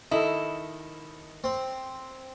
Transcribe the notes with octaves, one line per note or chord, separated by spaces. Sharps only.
D#3 E4 A4 D#5
C4